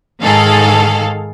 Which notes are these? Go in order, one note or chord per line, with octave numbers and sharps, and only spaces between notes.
G#2 D#3 G#4 A4 F5